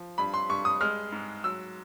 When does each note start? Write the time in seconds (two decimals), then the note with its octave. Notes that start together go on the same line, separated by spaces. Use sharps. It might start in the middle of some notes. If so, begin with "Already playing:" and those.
Already playing: F3
0.18 G2 B5
0.34 C6
0.50 G2 C#6
0.65 D#6
0.81 G#3 F6
1.12 G#2
1.44 F#3 E6